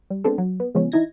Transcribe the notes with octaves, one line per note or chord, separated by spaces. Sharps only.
G3
G#3 B3 C4 D4 A4
F#3
B3
C#3 F3 G#3 B3 C#4
E3 D#4 E4 G#6 A#6